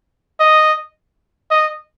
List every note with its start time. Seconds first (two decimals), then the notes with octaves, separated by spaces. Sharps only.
0.40 D#5
1.51 D#5